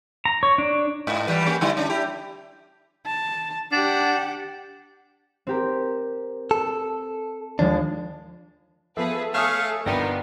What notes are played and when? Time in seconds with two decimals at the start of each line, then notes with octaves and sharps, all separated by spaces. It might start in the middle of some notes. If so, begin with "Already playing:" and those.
0.25 A#5
0.43 C#5
0.58 D4
1.07 G#2
1.27 E3 G3 B4
1.46 A#3 C#4 G4
1.61 D3 G3 E4
1.77 C#4 D4
1.90 E4 G4
3.06 A5
3.72 D4 G4 F#5
5.47 C4 G4 A#4
6.51 A4
7.59 D#2 F3 G#3 D4
8.97 F3 B3 G#4 A4 B4 E5
9.34 A3 G#4 C#5 F5 D#6 F6 E7
9.86 G1 B2 B3 D4 D#4 A#4 G5